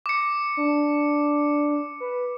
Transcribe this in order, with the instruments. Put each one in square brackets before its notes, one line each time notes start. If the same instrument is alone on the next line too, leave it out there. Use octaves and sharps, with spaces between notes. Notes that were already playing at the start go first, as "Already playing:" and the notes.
[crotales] D6 C#7
[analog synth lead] D4
B4